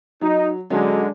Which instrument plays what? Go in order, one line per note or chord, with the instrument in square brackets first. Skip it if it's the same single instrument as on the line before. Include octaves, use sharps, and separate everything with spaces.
[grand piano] F#3 [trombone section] D#4
[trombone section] D3 G#3 [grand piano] F#3 C#4 D#5